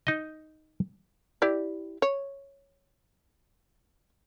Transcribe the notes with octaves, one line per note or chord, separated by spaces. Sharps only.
D#4 D#5
E4 G4 D5
C#5